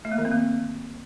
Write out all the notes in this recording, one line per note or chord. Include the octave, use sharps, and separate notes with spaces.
A3
A#3
D#3
C4
A#3